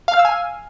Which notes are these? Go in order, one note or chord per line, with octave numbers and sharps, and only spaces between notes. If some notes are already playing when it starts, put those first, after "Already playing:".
F5
F6
E6
G#5